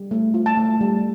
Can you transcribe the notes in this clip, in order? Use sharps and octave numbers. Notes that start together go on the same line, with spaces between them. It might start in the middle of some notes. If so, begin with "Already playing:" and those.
Already playing: G3
A3
F4
A5
A3
G3